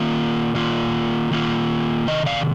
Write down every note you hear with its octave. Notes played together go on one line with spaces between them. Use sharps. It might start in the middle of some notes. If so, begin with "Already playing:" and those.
Already playing: D#3 A#3 F4 A#4 D5
D#3 A#3 F4
D#3 A#3 F4
C3 D#3 D#5
D5 F5